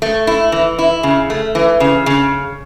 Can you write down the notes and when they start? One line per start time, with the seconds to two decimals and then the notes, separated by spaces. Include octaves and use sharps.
0.02 A3
0.27 E4
0.52 E3
0.79 E4
1.03 C#3
1.30 A3
1.55 E3
1.80 C#3
2.06 C#3